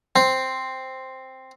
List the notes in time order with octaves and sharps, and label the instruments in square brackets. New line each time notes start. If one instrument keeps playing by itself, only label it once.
[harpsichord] C4